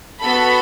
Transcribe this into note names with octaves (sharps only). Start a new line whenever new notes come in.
B3 F#4 A4 B5